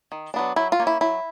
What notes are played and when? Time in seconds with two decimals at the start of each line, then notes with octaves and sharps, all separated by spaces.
0.12 D#3
0.34 F#3 B3 D4
0.56 F#3 E4
0.72 F4
0.80 A#3 C#4
0.87 E4
1.01 F#3 E4